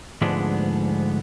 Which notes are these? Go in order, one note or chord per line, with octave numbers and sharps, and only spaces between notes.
D2 G#2 F3 G#3 B3 D4